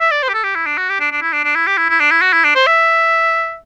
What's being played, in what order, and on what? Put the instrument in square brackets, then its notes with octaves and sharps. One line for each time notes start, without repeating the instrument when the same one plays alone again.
[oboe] E5
D5
C5
G4
A4
G4
E4
D4
F#4
G4
D4
D4
E4
D4
D4
E4
G4
E4
E4
D4
E4
F#4
E4
D4
C5
E5